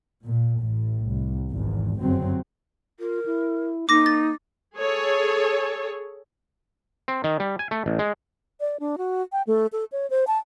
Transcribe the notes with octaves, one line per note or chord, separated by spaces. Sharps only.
A#2
A1 A2
C2
G#1 E2
G1 F#2 C#3 F#3 C4
F4 A#4
E4
A#3 D#4 D6 A#6
A6
G#4 A4 C#5
C4
D#3
G3
G#5
A3
A1
G#3
D5
D4
F#4
G5
A3
A4
C#5
C5
A5